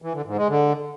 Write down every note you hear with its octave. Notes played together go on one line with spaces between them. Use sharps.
E3
D3
G#2
G#3
D3